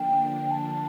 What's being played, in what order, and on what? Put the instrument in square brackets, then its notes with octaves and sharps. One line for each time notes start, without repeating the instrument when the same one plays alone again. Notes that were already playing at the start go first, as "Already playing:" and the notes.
Already playing: [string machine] D3 F3 A#3 D4 [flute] G5
[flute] A5